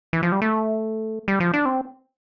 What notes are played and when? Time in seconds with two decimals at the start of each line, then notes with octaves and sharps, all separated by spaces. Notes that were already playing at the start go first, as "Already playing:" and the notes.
0.13 E3
0.23 F3
0.32 G3
0.42 A3
1.28 G3
1.40 F3
1.54 D4
1.65 C4